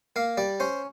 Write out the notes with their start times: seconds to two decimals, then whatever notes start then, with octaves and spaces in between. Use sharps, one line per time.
0.16 A#3 F5
0.37 G3 D5
0.60 C#4 C5